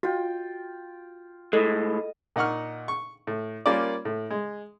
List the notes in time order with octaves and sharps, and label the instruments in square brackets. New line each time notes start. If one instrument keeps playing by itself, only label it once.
[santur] F4 G5 [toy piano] F#4
[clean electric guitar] A2 G#3 [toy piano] A4 [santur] D#5
[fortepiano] A#2 D#4 F#5 C#6 F6
C#6
A2
G3 A#3 C#4 F4 A#4 D5
A2
G#3